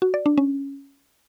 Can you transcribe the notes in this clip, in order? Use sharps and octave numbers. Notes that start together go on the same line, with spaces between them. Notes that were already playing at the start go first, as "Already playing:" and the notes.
F#4
D5
D4
C#4